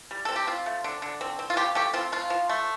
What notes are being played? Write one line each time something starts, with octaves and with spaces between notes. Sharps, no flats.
G3
C4 A4
G4
C4 F4
A3
D3
D3
C4
C4
F4
F3 G4
A3 G4
C4 F4
F3 F4
F3
A3